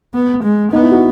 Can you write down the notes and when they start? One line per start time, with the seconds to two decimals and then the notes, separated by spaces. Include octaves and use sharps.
0.14 B3
0.44 G#3
0.72 B3 D#4
0.82 E4
0.92 F#4